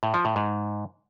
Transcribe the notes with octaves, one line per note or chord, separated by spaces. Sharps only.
A2
F3
A2
G#2